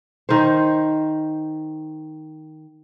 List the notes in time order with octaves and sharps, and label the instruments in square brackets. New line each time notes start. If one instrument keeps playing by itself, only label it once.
[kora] D#3 C5